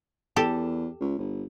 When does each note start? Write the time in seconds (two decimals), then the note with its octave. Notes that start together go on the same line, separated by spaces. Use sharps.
0.36 E2 G4 A4
1.01 C#2
1.18 G1